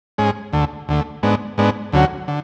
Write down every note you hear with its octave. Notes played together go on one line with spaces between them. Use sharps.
G#2 G#3 C#4 G#4
D2 D3 A3
D2 D3 A3
G#2 G#3 B3 D4
G#2 G#3 B3 D4
D2 D3 F#3 C#4 F#4
D3